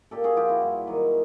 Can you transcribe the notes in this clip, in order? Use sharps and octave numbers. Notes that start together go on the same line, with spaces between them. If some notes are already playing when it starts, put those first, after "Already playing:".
A#2 G4 A4
F#4 G#4
F3 F4 G4
E4 F#4
G2
D#3 F#3